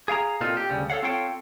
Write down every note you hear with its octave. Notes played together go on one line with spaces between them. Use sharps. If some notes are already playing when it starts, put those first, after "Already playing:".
G#4 F5 G5 A#5
A#2 C4 D#4 F4 A4
G4
D2 C#3 G3
A4 A#4 C#5 F5 F#5
C4 F4 A4 C#5 F5 G5